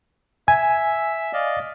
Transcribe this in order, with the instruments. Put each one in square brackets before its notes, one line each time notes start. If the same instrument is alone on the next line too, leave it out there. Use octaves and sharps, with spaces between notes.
[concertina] E5 E6 [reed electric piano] G#5
[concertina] D5 D#5 F5